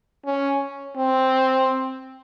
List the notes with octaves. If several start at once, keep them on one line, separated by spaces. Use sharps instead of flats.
C#4
C4